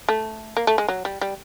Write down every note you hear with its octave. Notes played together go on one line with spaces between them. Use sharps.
A3
A#3
A3
G#3
F#3
G3
G3